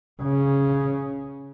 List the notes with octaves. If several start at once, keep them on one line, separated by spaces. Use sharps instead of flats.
C#3